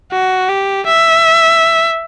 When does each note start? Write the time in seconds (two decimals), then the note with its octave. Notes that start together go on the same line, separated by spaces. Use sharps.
0.12 F#4
0.49 G4
0.87 E5